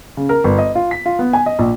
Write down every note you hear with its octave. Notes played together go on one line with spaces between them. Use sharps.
C#3
A#4
G1
D#5
F4
B6
F4
B3
G#5
D#5
A#1